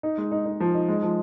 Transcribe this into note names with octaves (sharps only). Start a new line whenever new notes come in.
D#4
G#3
D#4
D#4
F3
D#4
G#3
F3